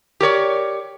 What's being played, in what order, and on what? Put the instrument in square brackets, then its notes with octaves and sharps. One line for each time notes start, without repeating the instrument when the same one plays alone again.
[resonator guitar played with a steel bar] G4 A#4 C#5 D5